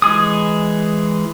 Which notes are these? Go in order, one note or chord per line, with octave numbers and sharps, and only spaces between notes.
E3 G#3 G#4 D#6